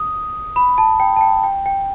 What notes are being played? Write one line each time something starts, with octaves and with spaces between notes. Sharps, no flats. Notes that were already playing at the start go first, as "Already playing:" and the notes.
Already playing: D#6
B5
A5
G5
A5
G5
G5
G5